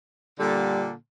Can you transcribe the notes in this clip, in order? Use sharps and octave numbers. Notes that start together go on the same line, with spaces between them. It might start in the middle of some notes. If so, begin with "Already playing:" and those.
A#2 D3 G3